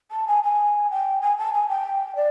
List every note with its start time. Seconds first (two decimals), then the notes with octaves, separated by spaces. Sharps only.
0.11 A5
0.28 G#5
0.44 G#5
0.91 G5
1.21 G#5
1.38 A5
1.54 G#5
1.69 G5
2.16 D5